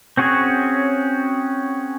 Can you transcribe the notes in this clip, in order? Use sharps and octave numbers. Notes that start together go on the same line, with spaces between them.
C4 C#4 F#4 G#4 C#5